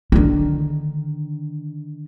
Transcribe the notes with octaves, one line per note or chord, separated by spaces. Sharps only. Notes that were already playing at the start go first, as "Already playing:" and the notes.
D3 D#3